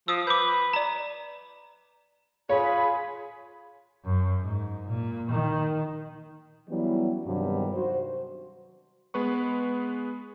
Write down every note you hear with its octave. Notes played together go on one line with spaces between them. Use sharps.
F3 D#6 E6
B4 D6 G6
D5 A#5
F4 G#4 C#5 B5
F#2
G#2
A#2
D#3
E3 F#3 G3 B3 C#4 E4
E2 G2 C3 D#3 F#3
F#4 C5
G#3 B3 B4 C#6